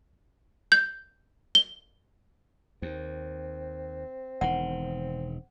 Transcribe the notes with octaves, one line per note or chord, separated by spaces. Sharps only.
G6
G7
D#2 C4
E1 D#3 F#5